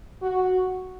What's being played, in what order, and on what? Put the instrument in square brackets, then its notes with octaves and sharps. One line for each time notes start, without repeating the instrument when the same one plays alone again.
[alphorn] F#4